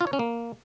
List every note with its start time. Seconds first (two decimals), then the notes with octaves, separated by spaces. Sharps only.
0.01 F4
0.07 C#5
0.13 C#4
0.19 A#3